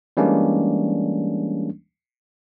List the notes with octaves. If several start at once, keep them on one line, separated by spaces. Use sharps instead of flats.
E3 G3 G#3 A#3 C#4 D4